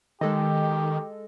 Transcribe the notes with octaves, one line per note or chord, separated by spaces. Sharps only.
D#3 G#3 G4 A4 D#5